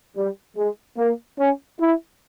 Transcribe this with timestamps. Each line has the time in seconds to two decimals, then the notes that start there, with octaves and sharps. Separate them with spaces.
0.16 G3
0.56 G#3
0.97 A#3
1.38 C#4
1.79 E4